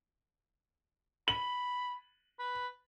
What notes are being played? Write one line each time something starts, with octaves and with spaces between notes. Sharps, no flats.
B5 F#7
B4